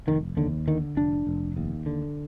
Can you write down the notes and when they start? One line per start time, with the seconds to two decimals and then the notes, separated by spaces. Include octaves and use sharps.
0.07 F1 D#3
0.37 D#2 D3
0.67 D3 D#3
0.97 F1 D4
1.27 F1
1.57 D#2
1.86 D3